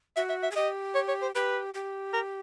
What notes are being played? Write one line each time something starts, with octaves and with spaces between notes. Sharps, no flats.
F#4 E5
E5
E5
G#4
G4 D#5
C#5
C#5
C5
G4 B4
G4
A#4